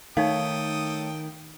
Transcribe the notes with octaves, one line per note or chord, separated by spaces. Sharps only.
D#3 A3 D#4 A4 C#5 F5 G5 D#6